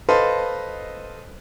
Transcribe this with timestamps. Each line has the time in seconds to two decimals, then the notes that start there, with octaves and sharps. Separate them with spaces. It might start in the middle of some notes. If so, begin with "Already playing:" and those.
0.09 A4 B4 C5 D#5 F5